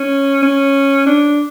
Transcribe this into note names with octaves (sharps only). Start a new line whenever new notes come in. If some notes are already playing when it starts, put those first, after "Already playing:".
Already playing: C#4
C#4
D4